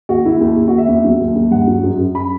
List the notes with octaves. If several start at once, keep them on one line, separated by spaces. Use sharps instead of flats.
D#2 F#4
D#2 E4
D#2
D#2
D#2 F#4
E5
E2
F#3
D#2
D#2
G2 F#5
F#3
F#2
F#2
B5